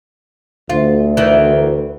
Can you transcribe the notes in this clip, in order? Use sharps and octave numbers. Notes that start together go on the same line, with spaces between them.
D2 F4
D#3 E3